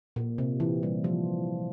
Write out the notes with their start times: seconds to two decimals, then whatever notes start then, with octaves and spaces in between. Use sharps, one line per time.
0.16 A#2
0.38 C3
0.60 E3
0.83 G3
1.04 F3